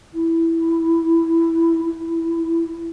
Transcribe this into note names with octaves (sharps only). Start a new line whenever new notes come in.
E4
E4